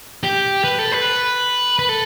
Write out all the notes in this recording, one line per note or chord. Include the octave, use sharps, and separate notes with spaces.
G4
B4
A4
B4
B4
A4